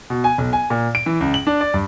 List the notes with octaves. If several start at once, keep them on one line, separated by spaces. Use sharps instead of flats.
B2
G#5
B1
G#5
A#2
D7
E3
C#2
F#7
D4
D5
G2